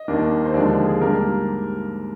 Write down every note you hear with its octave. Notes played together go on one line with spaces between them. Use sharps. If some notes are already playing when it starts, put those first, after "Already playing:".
Already playing: D#5
D#2 D#3 A#3 D4
C5
D#2 D3 F3 G#3 D4 D5
G#4
G#2 G3 A#3 D4 A#4